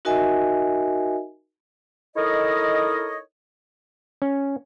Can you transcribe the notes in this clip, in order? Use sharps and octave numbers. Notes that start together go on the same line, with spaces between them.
D#4 F#4 A#4 D#5 E5 G#5
D#4 E4 A4 A#4 C#5 D#5
C#4